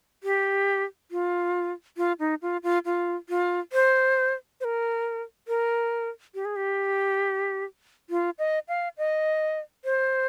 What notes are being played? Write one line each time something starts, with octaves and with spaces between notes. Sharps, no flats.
G4
F4
F4
D#4
F4
F4
F4
F4
C5
C5
A#4
A#4
G4
G#4
G4
F4
D#5
F5
D#5
C5